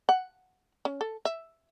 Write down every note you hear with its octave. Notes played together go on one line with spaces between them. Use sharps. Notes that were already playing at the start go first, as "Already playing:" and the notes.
F#5
C#4
A4
E5